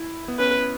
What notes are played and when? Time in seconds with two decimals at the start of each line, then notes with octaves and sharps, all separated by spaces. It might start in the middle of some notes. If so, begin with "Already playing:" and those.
Already playing: E4
0.28 B3
0.39 C#4 B4